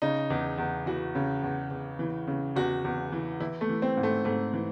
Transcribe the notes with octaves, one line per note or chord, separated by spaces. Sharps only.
C#3 D#4
E2
E2
E3 F#4
C#3
E2
E2
E3
C#3
E2 F#4
E2
E3
E3 E4
A3
E3
C4
G#2
A3
G#2 A3
E3